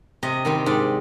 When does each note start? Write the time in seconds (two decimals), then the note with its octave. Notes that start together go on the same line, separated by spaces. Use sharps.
0.23 C3 D#5
0.45 D#3 G3 C4
0.66 G#2 D5